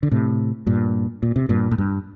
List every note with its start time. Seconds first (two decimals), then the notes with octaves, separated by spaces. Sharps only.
0.03 D3
0.11 A2 C3
0.66 G2 A#2
1.23 A#2
1.36 C3
1.49 G2 A#2
1.71 A2
1.78 G2